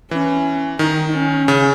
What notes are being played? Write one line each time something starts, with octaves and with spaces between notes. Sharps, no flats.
E3 C#4
D#3 D#4
C#4
C#3